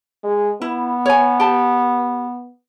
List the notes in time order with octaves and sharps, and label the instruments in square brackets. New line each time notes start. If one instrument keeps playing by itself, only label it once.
[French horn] G#3
[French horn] B3 [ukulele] E4
[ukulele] C#5 G#5
G4 A5